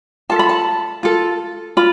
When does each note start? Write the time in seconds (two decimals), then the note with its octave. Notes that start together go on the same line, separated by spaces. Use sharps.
0.30 F4 A4 A5
0.39 B5
0.49 A5
1.03 F4 A4
1.77 F4 B5